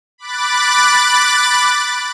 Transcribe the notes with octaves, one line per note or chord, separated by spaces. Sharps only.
B5 D6 F#6 A6